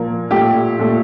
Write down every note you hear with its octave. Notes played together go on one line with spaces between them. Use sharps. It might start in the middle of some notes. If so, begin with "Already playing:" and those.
Already playing: A#2 F3 A#3
A#2 A3 G4
A#2 A3